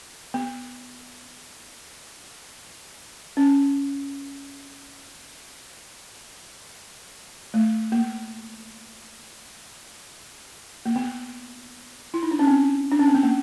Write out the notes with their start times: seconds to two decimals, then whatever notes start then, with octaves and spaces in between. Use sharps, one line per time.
0.34 B3
3.37 C#4
7.54 A3
7.92 A#3
10.86 A#3
10.96 B3
12.14 E4
12.23 D#4
12.31 D4
12.39 C#4
12.47 C4
12.91 D4
12.99 C#4
13.08 C4
13.15 B3
13.23 A#3